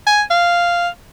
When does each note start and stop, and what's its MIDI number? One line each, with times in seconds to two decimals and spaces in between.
0.07 0.22 80
0.30 0.88 77